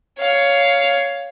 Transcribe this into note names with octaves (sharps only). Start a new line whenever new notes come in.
C#5 F5